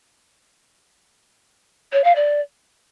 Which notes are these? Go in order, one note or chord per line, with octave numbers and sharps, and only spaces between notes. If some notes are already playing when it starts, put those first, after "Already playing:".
C#5
F5
D5